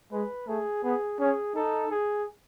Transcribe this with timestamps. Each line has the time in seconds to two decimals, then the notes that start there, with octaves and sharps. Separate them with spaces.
0.12 G#3 B4
0.48 A3 G#4
0.84 B3 G#4
1.19 C#4 G#4
1.55 D#4 A4
1.91 G#4